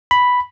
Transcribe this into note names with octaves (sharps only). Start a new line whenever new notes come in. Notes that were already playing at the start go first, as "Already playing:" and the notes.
B5